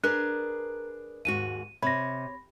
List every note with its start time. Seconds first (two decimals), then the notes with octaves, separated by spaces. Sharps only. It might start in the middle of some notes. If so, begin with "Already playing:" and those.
0.04 D4 G#4 A#4 B4 F#6
1.25 D#2 G#2 F#4 D#7
1.82 C3 C#5 B5 A#6